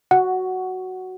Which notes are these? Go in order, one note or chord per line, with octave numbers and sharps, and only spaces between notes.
F#4 F#5